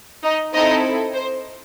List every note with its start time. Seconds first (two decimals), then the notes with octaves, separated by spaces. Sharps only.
0.24 D#4 D#5
0.54 C4 D#4 E4 A4 D#5
1.15 C5